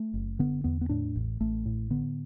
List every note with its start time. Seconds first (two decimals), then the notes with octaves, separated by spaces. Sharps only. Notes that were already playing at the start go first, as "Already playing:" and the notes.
Already playing: A3
0.14 F#1
0.39 D3 B3
0.64 E2 B3
0.81 B3
0.89 A2 D4
1.16 A1
1.41 A1 A3
1.66 A2
1.90 D3 B3